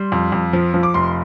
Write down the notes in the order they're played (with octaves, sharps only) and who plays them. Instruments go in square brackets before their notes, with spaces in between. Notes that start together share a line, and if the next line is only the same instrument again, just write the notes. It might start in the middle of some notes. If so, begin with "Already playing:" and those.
Already playing: [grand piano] G3 C6
F2
F2
F3
F3
D6
F1 C6